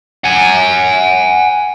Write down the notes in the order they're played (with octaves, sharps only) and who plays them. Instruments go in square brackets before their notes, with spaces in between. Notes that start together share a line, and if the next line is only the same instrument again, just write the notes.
[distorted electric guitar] F#5 G#5